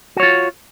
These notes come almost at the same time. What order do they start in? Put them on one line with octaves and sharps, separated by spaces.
F#4 C#5 F4